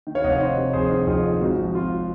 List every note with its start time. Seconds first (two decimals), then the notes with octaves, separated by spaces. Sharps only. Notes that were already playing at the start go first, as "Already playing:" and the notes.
0.07 D#3
0.15 C#5 F5
0.24 F1 D#5 F#5
0.32 C#5 F5
0.40 D#3 C5 D#5
0.57 C3
0.73 F2 G#4 C5
0.91 D#3
1.07 F2 F4 G#4
1.24 D#3
1.41 G#1 F#4
1.57 F3
1.75 G#1 F4